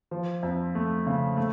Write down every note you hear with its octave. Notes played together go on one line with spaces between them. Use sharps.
F3
F2
A3
C#3
A3